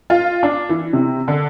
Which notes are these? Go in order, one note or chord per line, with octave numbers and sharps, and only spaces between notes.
F4
D4
E3
C3
D3